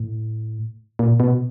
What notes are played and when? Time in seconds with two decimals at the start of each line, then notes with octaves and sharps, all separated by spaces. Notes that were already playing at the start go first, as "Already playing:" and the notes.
Already playing: A2
0.99 A#2
1.20 B2